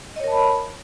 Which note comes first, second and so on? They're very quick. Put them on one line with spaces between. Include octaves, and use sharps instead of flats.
D#5 C#5 A#4 A5 B5